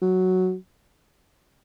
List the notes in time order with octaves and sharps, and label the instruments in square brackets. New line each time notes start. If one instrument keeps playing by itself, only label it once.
[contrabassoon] F#3